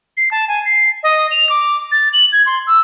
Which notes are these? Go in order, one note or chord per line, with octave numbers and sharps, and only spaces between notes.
C7
A5
G#5
C7
D#5
F7
D6
A6
F#7
G#6
C6
E6